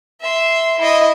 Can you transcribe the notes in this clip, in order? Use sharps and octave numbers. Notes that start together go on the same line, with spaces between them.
E5 C6
E4 D#5